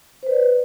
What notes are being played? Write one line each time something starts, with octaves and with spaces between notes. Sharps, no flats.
B4 C5 D5